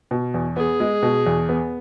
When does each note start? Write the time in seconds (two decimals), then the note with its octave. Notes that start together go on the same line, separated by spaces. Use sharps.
0.11 B2
0.34 E2
0.56 B3 G#4
0.80 G#3
1.03 B2
1.26 E2
1.49 B3